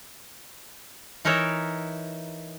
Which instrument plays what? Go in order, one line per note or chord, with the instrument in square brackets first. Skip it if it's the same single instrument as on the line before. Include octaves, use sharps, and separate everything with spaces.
[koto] E3 D#4 A#4 C#5 E5